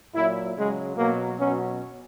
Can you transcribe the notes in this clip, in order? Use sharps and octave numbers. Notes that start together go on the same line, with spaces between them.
A#2 F#3 E4
C#3 F#3 G#3
B2 F#3 A#3
B2 F#3 C#4